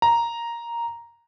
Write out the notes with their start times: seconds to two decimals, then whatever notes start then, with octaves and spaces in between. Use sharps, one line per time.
0.02 A#5